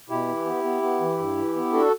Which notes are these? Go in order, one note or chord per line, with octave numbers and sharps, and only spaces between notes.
B2 E4 G4
E3
B3
B3
B3
E3
G2
E3
B3
D4 F#4 A4